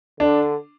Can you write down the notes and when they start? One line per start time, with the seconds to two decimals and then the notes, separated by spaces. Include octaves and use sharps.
0.20 D3 D4